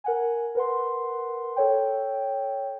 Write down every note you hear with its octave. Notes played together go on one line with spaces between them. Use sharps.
A#4 F#5 G#5
A#4 B4 F#5 C6
A4 C#5 G5